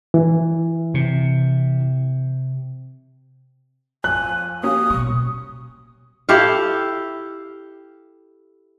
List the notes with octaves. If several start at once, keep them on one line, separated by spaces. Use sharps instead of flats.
E3
C3
F2 G#5 F#6
A#3 C#4 G4 D#6
B2 G3 C#6
E4 G4 A4 F5